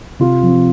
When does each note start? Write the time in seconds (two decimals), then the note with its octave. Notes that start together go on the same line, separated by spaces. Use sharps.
0.19 C3 F4
0.43 F3 C4